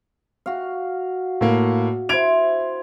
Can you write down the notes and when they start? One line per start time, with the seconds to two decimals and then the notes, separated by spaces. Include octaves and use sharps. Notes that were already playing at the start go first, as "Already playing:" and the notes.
0.46 F#4 F5
1.41 A2 A#3
2.09 E4 C5 G#6 D7 F7